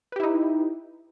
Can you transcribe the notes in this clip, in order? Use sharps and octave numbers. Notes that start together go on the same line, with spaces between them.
D#4 E4 G4 B4